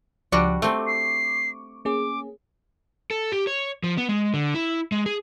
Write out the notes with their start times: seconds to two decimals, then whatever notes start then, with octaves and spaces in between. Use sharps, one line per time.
0.32 C#2 F3 G3 D4 F#4
0.62 A3 C4 C#6 D6
0.87 C7
1.85 A#3 C#4 G#4 D6
3.11 A4
3.32 G4
3.47 C#5
3.84 F3
3.97 B3
4.09 G#3
4.34 D3
4.55 E4
4.92 G#3
5.06 G#4